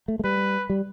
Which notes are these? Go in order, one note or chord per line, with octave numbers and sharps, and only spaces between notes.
A3
A3
G3 B4
G3